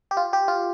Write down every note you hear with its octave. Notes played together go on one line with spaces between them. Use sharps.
G4
F4
G4
F4